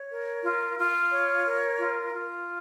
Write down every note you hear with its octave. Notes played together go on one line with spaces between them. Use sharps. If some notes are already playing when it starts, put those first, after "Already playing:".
Already playing: C#5
A#4
F4
F4
C#5
A#4
F4
F4